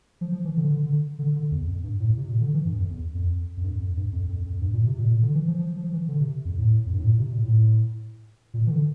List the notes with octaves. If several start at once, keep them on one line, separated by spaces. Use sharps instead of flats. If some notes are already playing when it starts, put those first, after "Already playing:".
F3
F3
E3
D3
D3
D3
D3
D3
E2
F2
G2
A2
C3
A#2
D3
E3
G2
F2
E2
F2
F2
G2
F2
G2
F2
F2
F2
G2
A#2
C3
A#2
A#2
D3
E3
F3
F3
F3
E3
D3
C3
F2
A2
F2
G2
A2
A#2
C3
A#2
A2
A#2
E3
D3